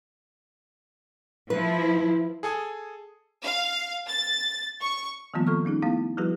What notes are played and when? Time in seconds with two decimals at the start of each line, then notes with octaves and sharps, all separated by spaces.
1.50 F3 E4 B4
2.43 G#4 A4 G#5 D#6
3.44 F5
4.08 A6
4.81 C#6
5.34 D#3 F3 G3 A#3 B3 F4
5.47 C4 A4 C#6 F6
5.65 G3 C#4 D#4 G#4
5.82 A3 B3 E4 F5
6.17 F3 G3 E4 F#4 G#4 B4